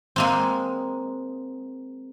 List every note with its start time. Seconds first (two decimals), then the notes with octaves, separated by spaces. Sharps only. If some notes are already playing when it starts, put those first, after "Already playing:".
0.16 G#3 A#3 C4